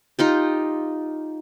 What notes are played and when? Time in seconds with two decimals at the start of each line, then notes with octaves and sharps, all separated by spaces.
0.19 D#4 F4 G4